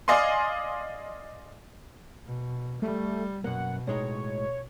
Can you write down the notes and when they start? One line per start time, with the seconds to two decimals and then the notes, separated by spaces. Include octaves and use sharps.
0.08 D5 D#5 F5 G#5 C6
2.26 B2
2.82 G3 A3
3.44 F#2 B2 A#3 F#5
3.87 A2 G#3 D#4 C#5